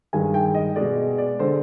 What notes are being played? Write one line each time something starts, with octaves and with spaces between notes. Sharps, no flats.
G2 D#3 G#3 G#5
G5
D#5
B2 G#3 D5
D5
D3 G#3 C5